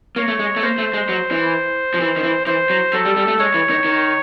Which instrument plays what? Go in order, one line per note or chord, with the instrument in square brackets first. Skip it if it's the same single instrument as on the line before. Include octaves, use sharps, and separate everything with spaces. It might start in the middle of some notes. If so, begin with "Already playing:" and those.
[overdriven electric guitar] A#3 [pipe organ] C#5
[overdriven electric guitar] A3
G#3
A3
[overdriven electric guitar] A#3 [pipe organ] C5
[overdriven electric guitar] A3
G#3
F#3
E3
F3
E3
D#3
E3
[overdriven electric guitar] E3 [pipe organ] C5
[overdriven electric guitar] F#3
[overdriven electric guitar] F#3 [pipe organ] A4
[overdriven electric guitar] G3
G3
A3
[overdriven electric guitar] G#3 [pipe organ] C#5
[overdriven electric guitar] E3
D#3
D#3